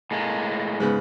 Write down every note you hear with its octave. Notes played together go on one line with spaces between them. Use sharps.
A2 G#3 A#3
G#2 C#3 B3